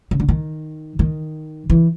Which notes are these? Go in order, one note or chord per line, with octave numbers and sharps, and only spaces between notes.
C#3
D3
D#3
D#3
E3